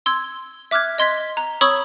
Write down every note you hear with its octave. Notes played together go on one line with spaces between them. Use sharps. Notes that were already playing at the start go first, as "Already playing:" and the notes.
C6 E6 G#6
E5 D6 F6 F#6 G#6
D#5 C6 G#6 B6
A#5
C#5 B5 C#6 D#6 E6 G#6